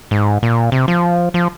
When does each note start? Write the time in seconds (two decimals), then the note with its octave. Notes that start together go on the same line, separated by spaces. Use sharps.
0.11 G#2
0.43 A#2
0.72 C3
0.88 F3
1.34 F3